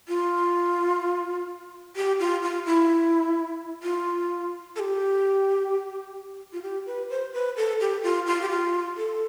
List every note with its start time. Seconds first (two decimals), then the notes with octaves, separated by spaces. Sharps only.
0.08 F4
1.96 G4
2.20 F4
2.43 F4
2.66 E4
3.83 F4
4.76 A4
4.80 G4
6.53 F4
6.62 G4
6.86 B4
7.10 C5
7.34 B4
7.57 A4
7.80 G4
8.03 F4
8.27 F4
8.42 G4
8.49 F4
8.97 A4